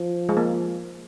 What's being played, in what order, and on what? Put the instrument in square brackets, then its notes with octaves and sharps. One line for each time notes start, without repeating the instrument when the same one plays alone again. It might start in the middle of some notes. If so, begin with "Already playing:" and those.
Already playing: [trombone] F3
[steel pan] G#3
A#3